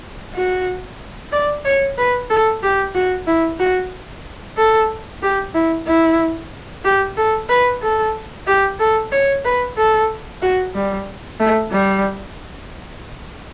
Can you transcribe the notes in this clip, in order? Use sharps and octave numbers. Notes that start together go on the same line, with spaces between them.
F#4
D5
C#5
B4
A4
G4
F#4
E4
F#4
A4
G4
E4
E4
G4
A4
B4
A4
G4
A4
C#5
B4
A4
F#4
G3
A3
G3